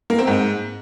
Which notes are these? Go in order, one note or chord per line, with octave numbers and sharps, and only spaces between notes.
A#3
C4
G#2